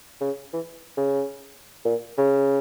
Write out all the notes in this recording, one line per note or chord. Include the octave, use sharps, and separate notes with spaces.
C#3
E3
C#3
A#2
C#3